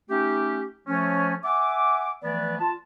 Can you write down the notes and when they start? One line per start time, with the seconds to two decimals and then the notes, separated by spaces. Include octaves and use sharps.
0.10 A3 C#4 D#4 G4
0.87 F3 A3 C#4
1.44 E5 F#5 G#5 D6
2.24 E3 F3 A3 B3 B4 D5
2.60 F4 A5